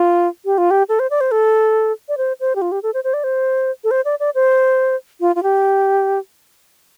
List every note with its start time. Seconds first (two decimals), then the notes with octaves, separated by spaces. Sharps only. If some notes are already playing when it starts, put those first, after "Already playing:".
Already playing: F4
0.45 G4
0.58 F4
0.71 G4
0.89 A4
0.99 C5
1.11 D5
1.21 C5
1.31 A4
2.09 D5
2.18 C5
2.40 C5
2.56 G4
2.62 F4
2.72 G4
2.83 A4
2.94 C5
3.04 C5
3.14 D5
3.24 C5
3.84 A4
3.91 C5
4.05 D5
4.20 D5
4.35 C5
5.21 F4
5.36 F4
5.43 G4